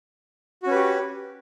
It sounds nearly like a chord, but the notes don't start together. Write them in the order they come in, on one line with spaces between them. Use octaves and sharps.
F#4 C#4 B4 G4